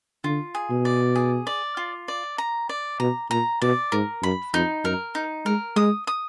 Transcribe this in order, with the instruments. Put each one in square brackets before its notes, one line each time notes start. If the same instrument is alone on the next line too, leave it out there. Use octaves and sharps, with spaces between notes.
[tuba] D3 [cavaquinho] F4
[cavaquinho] G#4
[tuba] B2
[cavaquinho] D5
G#4
D5
F4
D5
A#5
D5
[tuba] B2 [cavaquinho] A#5
[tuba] A#2 [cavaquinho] A#5
[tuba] B2 [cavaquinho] D5
[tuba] G#2 [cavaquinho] A#4
[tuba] F#2 [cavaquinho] B5
[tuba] F2 [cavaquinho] D#4
[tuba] F#2 [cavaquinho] A#4
[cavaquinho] D#4
[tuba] G#3 [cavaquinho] A#4
[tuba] G#3 [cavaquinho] D#6
[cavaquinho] D#6